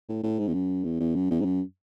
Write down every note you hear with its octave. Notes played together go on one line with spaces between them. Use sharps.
A2
A2
G#2
E2
F#2
E2
E2
F#2
E2
G#2
F#2